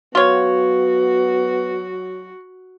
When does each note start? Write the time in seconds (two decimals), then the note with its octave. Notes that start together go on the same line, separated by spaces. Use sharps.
0.15 F#3 B3 F4 F#4 C#5